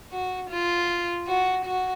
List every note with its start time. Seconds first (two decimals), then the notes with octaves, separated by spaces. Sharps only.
0.12 F#4
0.50 F4
1.27 F#4
1.65 F#4